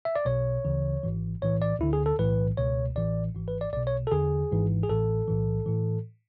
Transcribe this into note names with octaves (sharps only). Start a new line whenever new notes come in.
E5
D5
B1 B2 C#5
D2 C#3 E3
G#1 G#2 E3
B1 A2 E3 C#5
D5
D2 D3 E4
G#4
A4
B1 A2 E3 B4
C#2 B2 C#5
A1 A2 E3 D5
G#1 G#2 E3
B4
D5
B1 B2 D5
C#5
A4
E2 D3 G#4
G#1 G#2 E3
G#4
A1 A2 E3 A4
B1 A2 E3
A2 E3